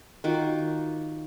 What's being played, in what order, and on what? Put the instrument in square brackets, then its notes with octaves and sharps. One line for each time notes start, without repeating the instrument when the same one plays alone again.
[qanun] D#3 F4 F#4 D6